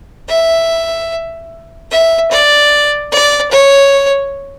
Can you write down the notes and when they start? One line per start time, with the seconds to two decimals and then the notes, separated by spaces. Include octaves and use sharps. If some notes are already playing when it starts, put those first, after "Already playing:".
0.29 E5
1.91 E5
2.31 D5
3.12 D5
3.52 C#5